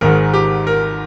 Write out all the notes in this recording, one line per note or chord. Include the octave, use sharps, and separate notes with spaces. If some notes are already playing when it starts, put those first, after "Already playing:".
G#1 G#2 D#3 G#3 A#4
G4
A#4